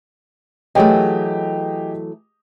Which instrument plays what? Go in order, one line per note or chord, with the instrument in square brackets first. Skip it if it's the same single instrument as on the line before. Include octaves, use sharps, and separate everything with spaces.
[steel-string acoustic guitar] E3 F#3 A3 [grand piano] G4 G#4 D#5